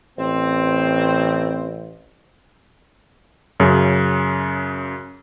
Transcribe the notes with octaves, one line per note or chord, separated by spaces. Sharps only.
A1 C4
F#2 C#3